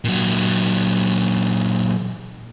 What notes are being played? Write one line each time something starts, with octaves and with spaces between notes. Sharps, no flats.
A#2 F#3